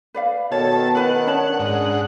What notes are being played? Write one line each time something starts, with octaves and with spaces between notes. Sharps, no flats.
B4 D5 F5
B2 D#3 A4 C#5 A5
E4 B4 F#5 G#5
C#4 D4 C#5 A5
G#2 F#5